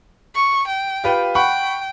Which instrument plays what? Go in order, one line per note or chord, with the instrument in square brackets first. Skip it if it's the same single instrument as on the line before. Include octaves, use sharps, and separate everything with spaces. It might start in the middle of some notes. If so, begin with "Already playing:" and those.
[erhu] C#6
G5
[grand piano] F4 G4 B4
[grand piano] F#5 B5 C#6 [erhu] G5